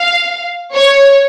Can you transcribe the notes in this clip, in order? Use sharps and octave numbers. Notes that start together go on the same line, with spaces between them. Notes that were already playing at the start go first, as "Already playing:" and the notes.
Already playing: F5
C#5